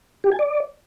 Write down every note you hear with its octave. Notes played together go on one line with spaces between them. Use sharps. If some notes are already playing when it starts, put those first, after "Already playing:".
G4
G#5
D5